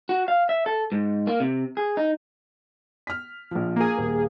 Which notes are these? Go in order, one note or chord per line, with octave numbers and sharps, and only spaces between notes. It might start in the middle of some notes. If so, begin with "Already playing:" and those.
F#4
F5
E5
A4
G#2
A#3
C3
G#4
D#4
F6 B6
A#1 F3
A#3 G#4
D#1